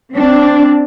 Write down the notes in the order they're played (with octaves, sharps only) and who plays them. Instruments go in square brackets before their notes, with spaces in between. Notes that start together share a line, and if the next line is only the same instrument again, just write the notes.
[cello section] C4 D4